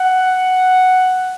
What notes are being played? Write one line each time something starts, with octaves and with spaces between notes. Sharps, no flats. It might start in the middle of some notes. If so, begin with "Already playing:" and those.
Already playing: F#5